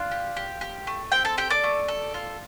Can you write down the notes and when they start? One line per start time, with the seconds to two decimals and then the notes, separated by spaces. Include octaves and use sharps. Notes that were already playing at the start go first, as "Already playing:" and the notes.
Already playing: D4 F4 F5
0.11 G4
0.37 G4
0.61 G4
0.87 A3
1.12 C4 G4 G5
1.25 A4 A5
1.37 G4 A4 G5
1.50 D5 D6
1.63 A3
1.88 A4
2.14 F4